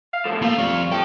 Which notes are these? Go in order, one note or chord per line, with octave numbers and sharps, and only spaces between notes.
F5
A2 F3 A4
A3 A#3 F4
F3 G3 C4 C#6
F4 A4 G5